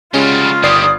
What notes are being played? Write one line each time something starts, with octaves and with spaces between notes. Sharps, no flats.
C#3 G3 G#3 C#4 F4 F#4 F5
G1 D#3 G3 D5 D#6 C7